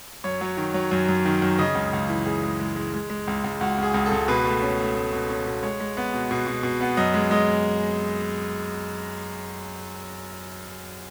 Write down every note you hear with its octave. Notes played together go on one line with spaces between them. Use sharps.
F#2 C#5
F#3
D#3
F#3
F#2
F#2
D#3
F#2
C#3 D#5
C#2
C#2
E3
C#2 G#4
G#3
G#3
G#3
G#3
G#3
C#2
C#2
C#2 F#4
C#2 G#4
C#2
A4
C#2
B2 B4
A3
C#4
A3
A3
B2
C#4
B2
G#3 C#5
G#3
B3
B2
B2
B2
B2
B3
F#2 D#5
G#3
G#3 D#5